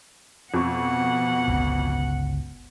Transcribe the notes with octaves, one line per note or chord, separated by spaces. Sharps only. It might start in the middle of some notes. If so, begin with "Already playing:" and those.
F2 B2 F#5 C#6
G1 C#2 C#3